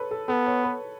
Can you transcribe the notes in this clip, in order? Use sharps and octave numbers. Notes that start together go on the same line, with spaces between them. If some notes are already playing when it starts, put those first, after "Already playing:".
Already playing: A4 B4 C#5
A4
B3 A4
C#5
B4